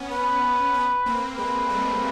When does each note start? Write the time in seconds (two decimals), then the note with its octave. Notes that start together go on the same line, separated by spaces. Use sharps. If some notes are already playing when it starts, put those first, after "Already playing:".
Already playing: B3 C#4
0.11 B3 C#4 B4
0.74 B3 C#4
1.06 A#3 C4
1.37 G#3 A#3 B4
1.69 G3 A3